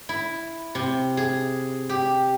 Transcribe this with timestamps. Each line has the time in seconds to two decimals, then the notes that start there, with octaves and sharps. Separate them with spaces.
0.09 E4
0.75 C3
1.17 G#4
1.89 G4